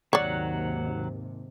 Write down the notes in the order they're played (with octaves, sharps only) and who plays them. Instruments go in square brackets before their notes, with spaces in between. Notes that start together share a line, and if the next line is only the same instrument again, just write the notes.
[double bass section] D#2 G#2 C3 [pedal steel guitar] D#3 F#3 F#5 [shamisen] C#5 D5